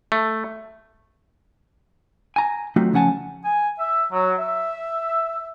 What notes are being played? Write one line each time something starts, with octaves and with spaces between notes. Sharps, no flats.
A3
G#5 A#5
F#3 A3 C4 D#4 F4 F#4
C#3 F3 C#4 F#5 G#5 A5
G#5
E5
F#3
E5